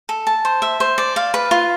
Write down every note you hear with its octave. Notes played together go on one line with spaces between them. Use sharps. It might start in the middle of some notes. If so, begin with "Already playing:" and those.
A4
A5
C5
E5
C5
D5
F5
B4
F4